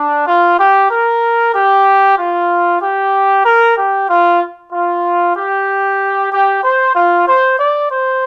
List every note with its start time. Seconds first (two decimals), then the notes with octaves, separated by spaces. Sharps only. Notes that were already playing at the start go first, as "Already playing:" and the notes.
Already playing: D4
0.27 F4
0.59 G4
0.91 A#4
1.55 G4
2.19 F4
2.82 G4
3.46 A#4
3.78 G4
4.09 F4
4.73 F4
5.37 G4
6.32 G4
6.64 C5
6.96 F4
7.28 C5
7.60 D5
7.92 C5